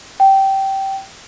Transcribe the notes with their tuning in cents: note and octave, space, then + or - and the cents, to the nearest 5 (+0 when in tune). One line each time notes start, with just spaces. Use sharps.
G5 -15